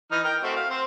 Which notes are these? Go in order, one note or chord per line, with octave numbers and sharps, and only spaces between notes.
E3 D#4 F6
A#4 G5
A3 C4 F#4
F5
C4 C5